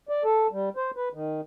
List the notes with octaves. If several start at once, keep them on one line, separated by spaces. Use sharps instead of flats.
D5
A4
G3
C5
B4
D#3